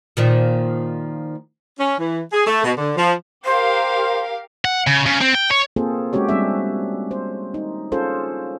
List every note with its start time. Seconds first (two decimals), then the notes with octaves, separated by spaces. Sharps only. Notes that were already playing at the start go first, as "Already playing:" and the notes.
0.17 A#2 D#3 F3
1.78 C#4
1.99 E3
2.32 G#4
2.47 A3
2.64 B2
2.77 D3
2.96 F3
3.45 G4 A#4 C5 F5
4.65 F#5
4.87 C#3
5.06 C#3
5.21 C4
5.35 G5
5.51 C#5
5.76 A#3 C4 F4 G#4 A4 C5
6.13 G#3 C#4 F#4 G4 C#5
6.29 G3 C4 D4 E5
7.11 C5
7.54 D#4
7.92 C#4 F4 G#4 A4 C5